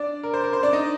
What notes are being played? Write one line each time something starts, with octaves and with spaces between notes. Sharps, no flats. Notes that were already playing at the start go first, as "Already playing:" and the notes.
Already playing: D4 D5
A#4
C5
A#4
C5
D4 D5
D#4 D#5